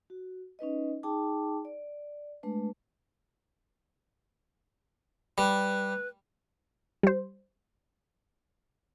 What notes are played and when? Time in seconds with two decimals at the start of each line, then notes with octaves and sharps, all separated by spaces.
0.10 F#4
0.59 C#4 D#4 B4 D#5
1.03 D#4 G#4 G5 A5 D6
1.65 D5
2.43 G#3 A3 D4 B4
5.38 G3 B4
7.03 G3 C5